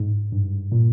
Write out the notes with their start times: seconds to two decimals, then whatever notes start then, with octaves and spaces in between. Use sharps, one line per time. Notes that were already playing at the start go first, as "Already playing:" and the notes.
Already playing: G#2
0.32 G2
0.72 A#2